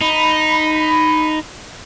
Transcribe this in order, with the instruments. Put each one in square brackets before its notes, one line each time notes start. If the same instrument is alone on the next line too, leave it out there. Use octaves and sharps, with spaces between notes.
[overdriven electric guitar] D#4 [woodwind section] B5